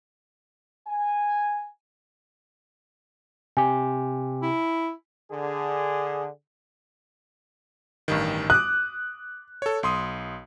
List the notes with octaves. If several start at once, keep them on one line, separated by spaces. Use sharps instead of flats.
G#5
C3 G4 G#5
E4
D3 G#4
A1 G2 D#3
D6 D#6 F#6
A4 C#5
B1 C6 D#6